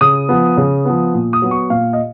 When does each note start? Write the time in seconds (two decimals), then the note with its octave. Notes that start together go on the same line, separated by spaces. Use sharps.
0.01 C#3 D#6
0.29 F3 B3
0.57 C#3
0.85 F3 B3
1.14 A#2
1.33 D#6
1.42 F#3 B3
1.51 C#6
1.70 A#2 F5
1.93 D#5